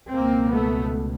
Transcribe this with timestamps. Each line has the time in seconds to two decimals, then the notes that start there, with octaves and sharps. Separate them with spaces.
0.12 C#2 B2 A#3 C4
0.54 A3 B3